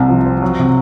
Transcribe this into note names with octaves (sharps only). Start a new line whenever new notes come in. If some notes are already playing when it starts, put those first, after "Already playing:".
Already playing: C2 C3
F3
C4
F#3
C3